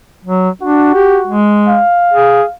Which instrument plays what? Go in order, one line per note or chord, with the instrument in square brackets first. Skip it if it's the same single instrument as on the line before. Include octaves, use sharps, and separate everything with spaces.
[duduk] F#3
[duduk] D4 [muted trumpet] F#4
[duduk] G4
G#3
[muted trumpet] F5
[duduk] G#4